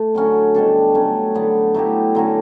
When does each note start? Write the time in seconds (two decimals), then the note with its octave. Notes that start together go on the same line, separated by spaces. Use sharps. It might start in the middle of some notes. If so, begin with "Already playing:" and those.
Already playing: A3
0.15 D3 F#3 C#4 F#4
0.55 B2 G3 D4 A4
0.95 F#3 A3 C#4
1.35 D3 F#3 B3
1.74 F#3 A3 E4 G4
2.15 D3 F#3 C#4